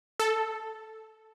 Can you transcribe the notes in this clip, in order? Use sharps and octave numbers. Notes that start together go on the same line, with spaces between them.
A4